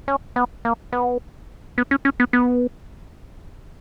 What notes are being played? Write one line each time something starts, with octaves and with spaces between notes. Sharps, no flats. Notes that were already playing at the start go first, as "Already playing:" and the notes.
C#4
B3
A#3
B3
B3
C#4
C#4
B3
B3